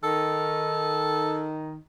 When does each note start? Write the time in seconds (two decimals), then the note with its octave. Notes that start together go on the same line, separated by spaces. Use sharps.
0.03 D#3 A4